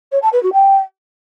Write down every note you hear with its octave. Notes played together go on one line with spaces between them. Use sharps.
C#5
A5
B4
F#4
G5